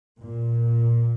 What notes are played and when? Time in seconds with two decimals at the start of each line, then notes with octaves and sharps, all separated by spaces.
0.19 A#2